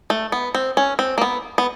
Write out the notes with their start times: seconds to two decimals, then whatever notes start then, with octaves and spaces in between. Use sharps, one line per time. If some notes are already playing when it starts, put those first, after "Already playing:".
0.10 A3
0.32 B3
0.55 C4
0.77 C#4
0.99 C4
1.18 A#3
1.21 B3
1.58 B3